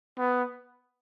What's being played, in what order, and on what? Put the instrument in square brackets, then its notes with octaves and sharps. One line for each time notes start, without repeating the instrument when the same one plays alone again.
[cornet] B3